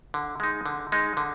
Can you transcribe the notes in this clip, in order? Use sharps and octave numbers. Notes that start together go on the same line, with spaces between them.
D3
G#3 D#4
D3
G#3 D#4
D3